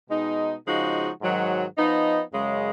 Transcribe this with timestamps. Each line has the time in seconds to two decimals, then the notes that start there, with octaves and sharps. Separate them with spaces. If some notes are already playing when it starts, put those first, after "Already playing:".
0.09 B2 G#3 D#4
0.66 C#3 F3 G#3 D#4 F#4
1.20 G#2 D#3 F#3
1.77 F3 B3 D#4
2.33 F#2 C#3 G#3